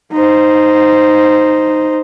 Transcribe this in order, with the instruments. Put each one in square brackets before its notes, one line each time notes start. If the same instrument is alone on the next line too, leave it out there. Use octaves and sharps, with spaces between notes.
[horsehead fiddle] D#4 C5